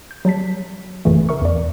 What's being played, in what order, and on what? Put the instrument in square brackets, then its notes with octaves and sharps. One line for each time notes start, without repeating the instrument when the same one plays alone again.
[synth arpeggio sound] G6
F#3 G3 A5 B6
A1 F#2 A#2 C#3 E3 A3
A#4 E5 C#6
E2 D5